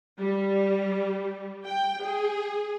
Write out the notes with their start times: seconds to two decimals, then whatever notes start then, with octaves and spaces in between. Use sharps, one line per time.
0.20 G3
1.65 G5
2.01 G#4